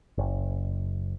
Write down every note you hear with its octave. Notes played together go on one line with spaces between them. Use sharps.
F#1